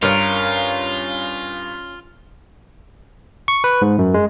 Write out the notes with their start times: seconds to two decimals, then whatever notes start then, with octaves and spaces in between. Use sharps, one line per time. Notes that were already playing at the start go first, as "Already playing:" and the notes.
0.03 G2 C#4 F4 A#4
3.48 C#6
3.64 B4
3.82 G#2
3.99 F#2
4.14 G#3